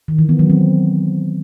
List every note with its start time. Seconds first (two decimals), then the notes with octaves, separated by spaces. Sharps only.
0.08 D#3
0.19 E3
0.29 B3
0.39 F#3
0.50 C4